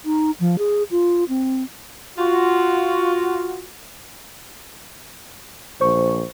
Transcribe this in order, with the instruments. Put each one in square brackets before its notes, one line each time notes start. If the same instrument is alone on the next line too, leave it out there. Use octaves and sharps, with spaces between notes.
[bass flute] D#4
F3
G#4
F4
C4
[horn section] F4 F#4
[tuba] A#1 [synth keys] C5 C#6